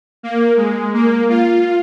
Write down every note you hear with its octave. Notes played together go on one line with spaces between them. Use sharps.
A#3
G#3
A#3
F4